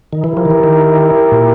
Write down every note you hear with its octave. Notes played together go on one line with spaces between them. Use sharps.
D#3
E3 E4 G4 A#4
F3
D#3
E3
D#3
A#2